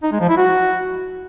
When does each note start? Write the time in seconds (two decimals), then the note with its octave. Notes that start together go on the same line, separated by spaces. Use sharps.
0.03 D#4
0.12 G#3
0.20 F3
0.29 E4
0.37 F#4